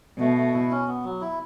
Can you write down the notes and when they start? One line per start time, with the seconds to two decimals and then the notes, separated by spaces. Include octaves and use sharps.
0.19 B2 A3
0.37 A3
0.53 E4
0.71 C#4
0.87 B3
1.04 F#3
1.21 E4